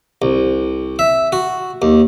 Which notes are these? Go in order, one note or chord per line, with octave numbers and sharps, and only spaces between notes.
C2
E5
F#4
D#2